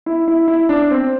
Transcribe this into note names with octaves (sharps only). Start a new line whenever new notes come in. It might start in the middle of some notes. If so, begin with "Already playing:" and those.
E4
E4
E4
D4
C4